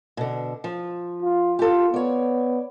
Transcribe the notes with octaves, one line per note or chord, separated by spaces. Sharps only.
B2 D3
F3
F4
F4 G4 A4
B3 C#5 D5